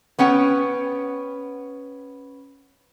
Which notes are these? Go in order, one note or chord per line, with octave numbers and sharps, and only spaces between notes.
B3 C#4 F#5 G5